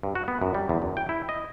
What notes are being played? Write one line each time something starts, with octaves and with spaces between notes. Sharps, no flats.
G2
F#4
B3
F#2
G3
E2
F#2
G5
E4
D#5